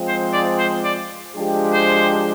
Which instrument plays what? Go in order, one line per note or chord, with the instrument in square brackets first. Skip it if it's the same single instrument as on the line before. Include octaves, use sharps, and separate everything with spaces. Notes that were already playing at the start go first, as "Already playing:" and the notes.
Already playing: [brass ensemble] F3 G#3 C4
[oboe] C5
D5
C5
D5
[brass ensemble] F3 G#3 D4 G4
[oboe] C5